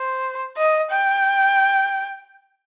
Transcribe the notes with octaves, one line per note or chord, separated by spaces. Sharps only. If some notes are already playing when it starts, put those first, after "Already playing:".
Already playing: C5
D#5
G5